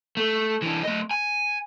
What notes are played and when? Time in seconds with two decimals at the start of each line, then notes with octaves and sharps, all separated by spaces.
0.17 A3
0.62 E3 D4
0.83 A3 D#5
1.11 G#5